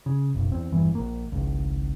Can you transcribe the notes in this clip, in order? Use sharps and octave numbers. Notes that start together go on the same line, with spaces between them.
C#3
F#1 B1
E2 C4
G#1 E2 G2 E3
A#1 A#3
G#1 C#2